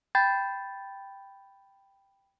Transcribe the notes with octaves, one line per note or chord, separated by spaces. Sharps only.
G5 B5 G6 A6